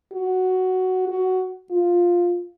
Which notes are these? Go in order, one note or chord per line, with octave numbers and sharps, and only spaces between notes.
F#4
F#4
F4